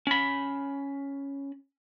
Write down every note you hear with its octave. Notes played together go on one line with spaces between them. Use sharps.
C#4 B5